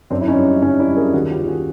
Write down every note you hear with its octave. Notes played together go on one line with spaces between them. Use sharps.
F#2 C4 D4
E4
C#4 D#4
G3
F#2 C#4 D#4
D4 E4
G3
G#4 A#4
D#2 F#4 G#4
F4 G4
D#2
F#4 G#4